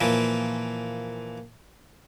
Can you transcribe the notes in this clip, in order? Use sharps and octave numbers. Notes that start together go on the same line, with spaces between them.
A#2 E3 F3